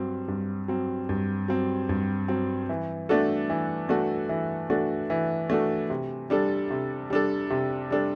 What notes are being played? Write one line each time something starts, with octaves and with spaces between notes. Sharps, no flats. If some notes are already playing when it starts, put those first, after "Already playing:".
Already playing: G2 F#3 C4
G2
F#3 C4
G2
F#3 C4
G2
F#3 C4
E3
A3 D4 F#4 A4
E3
A3 D4 F#4 A4
E3
A3 D4 F#4 A4
E3
A3 D4 F#4 A4
C3
G3 D4 A4
C3
G3 D4 A4
C3
G3 D4 A4